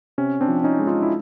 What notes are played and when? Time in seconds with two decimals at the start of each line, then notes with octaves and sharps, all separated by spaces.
0.18 C3 C#4
0.41 C4 D4
0.48 F3
0.64 C#4 D#4
0.79 G#3
0.87 D#4 F4
1.03 E4